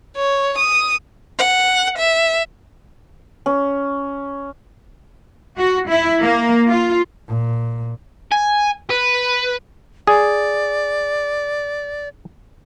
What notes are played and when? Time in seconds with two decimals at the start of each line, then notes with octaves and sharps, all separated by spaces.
0.17 C#5
0.58 D#6
1.39 F#5
1.98 E5
3.46 C#4
5.57 F#4
5.89 E4
6.22 A#3
6.68 F4
7.29 A#2
8.32 G#5
8.90 B4
10.07 G#4 D5